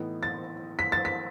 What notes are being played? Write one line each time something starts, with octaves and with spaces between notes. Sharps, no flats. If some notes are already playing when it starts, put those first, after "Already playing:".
Already playing: A2 E3 B3 D#4
A6
B6
A6
B6